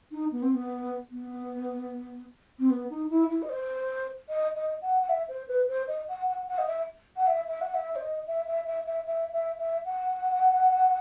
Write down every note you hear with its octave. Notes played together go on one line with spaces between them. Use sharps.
D#4
B3
C4
B3
B3
C4
B3
D#4
E4
E4
D#5
C5
D#5
D#5
F#5
F#5
E5
C5
B4
C5
D#5
F#5
F#5
F#5
D#5
E5
F#5
E5
E5
F#5
E5
C5
D#5
E5
E5
E5
E5
E5
E5
E5
F#5